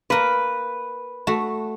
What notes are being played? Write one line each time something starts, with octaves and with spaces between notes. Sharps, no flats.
A#3 A#4 B4
A3 F#4